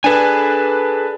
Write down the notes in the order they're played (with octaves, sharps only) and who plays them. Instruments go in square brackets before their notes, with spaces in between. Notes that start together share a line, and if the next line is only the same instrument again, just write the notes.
[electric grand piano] D4 B4 [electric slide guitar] G#4 A4 G#5